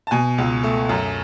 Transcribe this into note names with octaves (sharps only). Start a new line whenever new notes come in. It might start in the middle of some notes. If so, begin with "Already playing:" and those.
A5
B2 G#5
C#2
A3
F#2